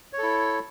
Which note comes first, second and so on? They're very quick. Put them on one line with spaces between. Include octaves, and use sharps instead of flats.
C#5 A4 E4